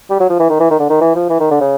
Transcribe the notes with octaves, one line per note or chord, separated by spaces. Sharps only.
G3
F#3
F3
E3
D#3
E3
D#3
D3
D#3
E3
F3
E3
D#3
D3
C#3